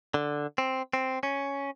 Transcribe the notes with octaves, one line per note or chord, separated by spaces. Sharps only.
D3
C4
C4
C#4